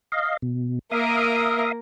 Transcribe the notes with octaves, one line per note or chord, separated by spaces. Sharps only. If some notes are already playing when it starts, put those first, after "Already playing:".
D#5 F5
B2
A#3 A#4 E5 F5 D#6